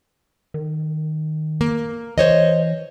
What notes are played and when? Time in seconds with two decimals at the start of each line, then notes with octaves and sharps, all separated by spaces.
0.54 D#3
1.61 A#3
2.18 E3 C5 C#5 D#5